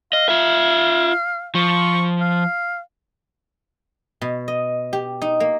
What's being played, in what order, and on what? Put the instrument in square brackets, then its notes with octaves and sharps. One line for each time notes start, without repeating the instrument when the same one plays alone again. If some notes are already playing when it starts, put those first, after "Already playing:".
[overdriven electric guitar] D#5 [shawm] F5
[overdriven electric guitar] F4 E5
[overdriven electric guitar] F3 [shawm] C#6
[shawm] F5
[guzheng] B2
D#5
G4
D#4
A#3